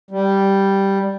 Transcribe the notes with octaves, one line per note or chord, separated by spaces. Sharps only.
G3